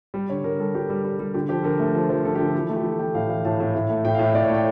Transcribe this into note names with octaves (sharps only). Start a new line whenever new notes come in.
G3
D3 C#5
D3 A#4
G3 A4
G3 G4
G3
G3
G3
D3 G4
F3 G4
D3 A#4
A3
F3
F3
D3 A4
D3 G4
A4
E3
A3
G4
E3 A4
A3 G5
A2 F5
E3 F5
A2 A5
A2
A2
A3
A2 G5
F5
A2
E5
A2 D5
C#5
A3 G5